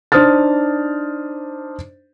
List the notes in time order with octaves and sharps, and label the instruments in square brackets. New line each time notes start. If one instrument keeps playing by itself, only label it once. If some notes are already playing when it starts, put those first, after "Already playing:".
[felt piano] D4 D#4 C5 D#6 F6 A6